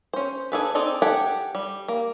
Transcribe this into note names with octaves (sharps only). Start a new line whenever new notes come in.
C#4 C5
D4 G#4 A4 B4
C4 D#4 A4 D5
G4 A4 F#5 G#5 A5
G3
A#3